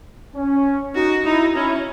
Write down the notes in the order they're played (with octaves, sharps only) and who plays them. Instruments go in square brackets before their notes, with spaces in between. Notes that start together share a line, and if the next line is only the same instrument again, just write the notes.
[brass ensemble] C#4
[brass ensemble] D#4 [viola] F#4
[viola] D#4 [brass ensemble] E4
[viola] C#4 [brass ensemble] E4